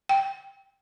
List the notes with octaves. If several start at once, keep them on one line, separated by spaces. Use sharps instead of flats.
G5